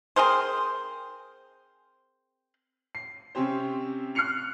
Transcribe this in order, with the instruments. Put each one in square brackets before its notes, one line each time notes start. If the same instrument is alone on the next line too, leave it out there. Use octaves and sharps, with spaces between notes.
[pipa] C4 G#4 A#4 C5
[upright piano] C7
C3 C4 C#4 G4 C5
F6 F#6 C7 C#7 F7